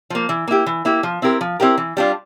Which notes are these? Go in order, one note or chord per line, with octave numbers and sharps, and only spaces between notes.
F3 A#3
E3
A#3 E4 G4
E3
A#3 E4 G4
F3
C4 E4 G4 A#4
F3
C4 E4 G4 A#4
E3
G3 D4 F4